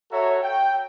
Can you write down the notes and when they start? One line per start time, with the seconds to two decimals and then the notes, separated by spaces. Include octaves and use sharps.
0.10 F#4 A4 C#5 E5 A#5
0.43 G5